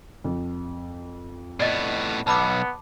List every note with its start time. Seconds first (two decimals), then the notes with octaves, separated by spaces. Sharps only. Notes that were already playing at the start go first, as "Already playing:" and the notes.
0.24 F2
1.60 A2 B3 D5 D#5
2.27 B1 B3 A5 B5 D6